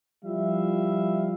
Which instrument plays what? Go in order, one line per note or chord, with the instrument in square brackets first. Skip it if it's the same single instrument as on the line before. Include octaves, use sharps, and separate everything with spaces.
[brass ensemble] F3 G3 E4 E5 F5